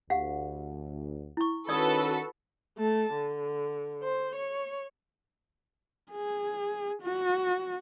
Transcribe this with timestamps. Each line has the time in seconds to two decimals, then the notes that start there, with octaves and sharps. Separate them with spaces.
0.10 D2 G4 F5 F#5
1.37 E4 C#6
1.69 D#3 C#4 F#4 A4 B4 D5 D#6 E6
2.78 A3 A5
3.14 D3
4.03 C5
4.35 C#5
6.11 G#4
7.02 F#4